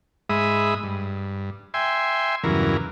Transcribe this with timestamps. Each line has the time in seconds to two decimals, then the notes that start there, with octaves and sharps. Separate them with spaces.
0.30 G#2 G#3 E5 B5 D#6
0.83 G2
1.74 E5 G5 G#5 C6
2.44 E2 G2 C#3 E3 F#3 A#4